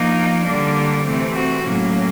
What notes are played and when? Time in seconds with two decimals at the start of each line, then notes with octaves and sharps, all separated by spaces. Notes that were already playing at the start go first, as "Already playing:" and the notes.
Already playing: F3 A#3 D#4
0.44 D3 G3 A#3 D4
1.04 C3 E3 A3 C4
1.34 F#4
1.64 A2 F#3 A#3 C#4